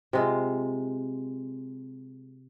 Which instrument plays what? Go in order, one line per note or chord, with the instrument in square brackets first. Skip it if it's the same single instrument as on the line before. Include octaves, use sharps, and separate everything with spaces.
[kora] C3 G#3 F4